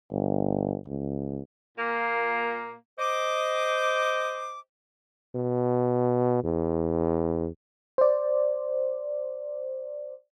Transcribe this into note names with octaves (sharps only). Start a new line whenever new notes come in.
G1
C#2
A#2 A#3
C5 D#5 D6
B2
E2
C5 D5